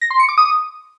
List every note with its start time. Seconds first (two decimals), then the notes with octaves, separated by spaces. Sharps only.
0.01 A#6
0.10 C6
0.20 C#7
0.29 D6
0.38 D#6